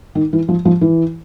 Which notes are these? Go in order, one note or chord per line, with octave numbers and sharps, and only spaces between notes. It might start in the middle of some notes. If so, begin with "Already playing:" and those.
D#3
E3
F3
F3
E3